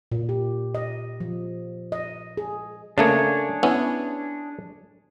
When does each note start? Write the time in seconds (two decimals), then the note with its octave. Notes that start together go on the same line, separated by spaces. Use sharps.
0.12 A#2
0.29 G4
0.75 D#5
1.20 F3
1.92 D#5
2.37 G#4
2.98 C#3 A3 A#3 D4 G#4 C#5
3.63 B3 C#4 E4